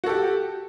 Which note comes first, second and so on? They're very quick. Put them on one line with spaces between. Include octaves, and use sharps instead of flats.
F#4 A4 G4